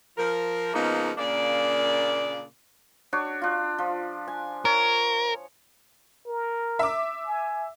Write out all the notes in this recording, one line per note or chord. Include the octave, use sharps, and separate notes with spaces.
F3 A#4
C#3 F3 G#3 A#3 B3 D#4
A#2 C#3 A#3 D4 D5
D4 F#4 C#5
D4 F4
F3
G#5
A#4 C#5
A#4
E5 D6
G#5